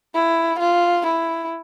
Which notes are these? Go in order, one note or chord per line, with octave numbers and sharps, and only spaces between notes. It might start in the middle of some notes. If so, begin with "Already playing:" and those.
E4
F4
E4